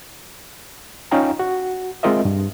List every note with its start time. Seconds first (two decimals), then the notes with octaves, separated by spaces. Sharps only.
1.11 C#4 D#4 F4 F5 G5 A#5
1.39 F#4
2.03 G#3 C4 F4 A#4 D#5 E5
2.25 G2